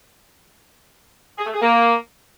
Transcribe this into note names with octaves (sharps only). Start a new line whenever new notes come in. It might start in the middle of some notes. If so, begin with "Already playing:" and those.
G#4
A3
G#4
A#3